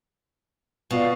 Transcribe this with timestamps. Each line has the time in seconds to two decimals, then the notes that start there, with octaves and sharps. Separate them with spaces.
0.91 B2 F4 D5 F5